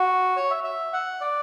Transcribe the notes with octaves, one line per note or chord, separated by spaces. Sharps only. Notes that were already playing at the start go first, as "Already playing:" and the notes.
Already playing: F#4
C#5
E5
E5
F#5
D5